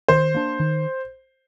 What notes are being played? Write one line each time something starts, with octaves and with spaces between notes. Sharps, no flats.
D#3 C5
A#3 D4
D#3